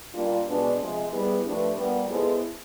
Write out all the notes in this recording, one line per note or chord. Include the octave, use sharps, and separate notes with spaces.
A#2 G3 A#3 D4 F4
B2 G#3 B3 D4
C3 F3 G#3
G3 B3 E4 G#4 B4
F3 A3 D4 G4 B4
A#2 G3 B3
G#3 B3 E4 A4 C5